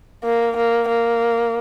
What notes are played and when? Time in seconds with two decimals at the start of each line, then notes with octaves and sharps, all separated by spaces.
0.24 A#3
0.57 A#3
0.89 A#3